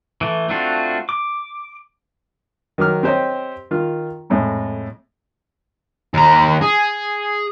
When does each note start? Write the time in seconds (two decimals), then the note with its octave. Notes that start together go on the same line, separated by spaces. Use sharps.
0.21 E3 A3
0.49 A3 C4 D4 F4 F#4
1.09 D6
2.78 D#3 F#3 D6 F6
3.03 C4 G4 C5 C#5 D#5
3.71 D#3 F4 F6
4.30 F2 A2 G#3
6.14 D#2 A#5
6.62 G#4